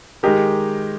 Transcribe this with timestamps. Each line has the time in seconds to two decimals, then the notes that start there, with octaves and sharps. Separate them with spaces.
0.23 D#3 G#3 D#4 G4 A#4